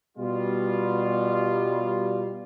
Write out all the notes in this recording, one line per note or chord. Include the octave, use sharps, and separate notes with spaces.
B2 G3 F4